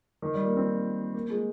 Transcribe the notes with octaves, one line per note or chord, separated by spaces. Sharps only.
D#3
G3
A#3
C4
A#3
G#3